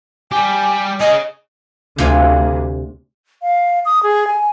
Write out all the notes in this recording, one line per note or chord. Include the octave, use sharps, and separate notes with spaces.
G3 G4 G#5
C#4 G#4 D#5
D2 C3 F4 G#5
F5
D#6
G#4
G#5